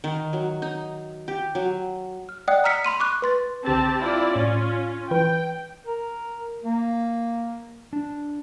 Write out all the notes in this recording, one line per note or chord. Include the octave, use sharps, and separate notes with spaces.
D#3
F#3
D#4
G4
F#3
F6
D5 D#5 F#5 G5 D#6 F#6
A#5 E6 F6 B6 C#7
B5 C6 D#7
C#6 D6 F#6
B4 C6 A6
C2 D3 C4 G4 A5 A6
E4 F4 D5
A2 C#4 F4
E3 B4 G5
A#4
A#3
D4